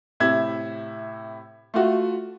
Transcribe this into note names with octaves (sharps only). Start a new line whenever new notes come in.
A2 C3 E4 E5 G#6
A3 F4 F#4